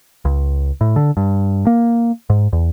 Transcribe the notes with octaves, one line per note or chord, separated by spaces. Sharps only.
C#2
A2
D3
G2
A#3
G#2
E2